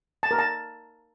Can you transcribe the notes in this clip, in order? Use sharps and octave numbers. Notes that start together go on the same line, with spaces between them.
A5
A#4
A5